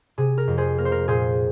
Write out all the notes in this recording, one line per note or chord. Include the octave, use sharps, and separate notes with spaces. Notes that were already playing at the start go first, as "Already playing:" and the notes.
C3 G#4
A#4
F2
G#4 C5
A#3 A#4
C5
A#4
A#2 G#4 C5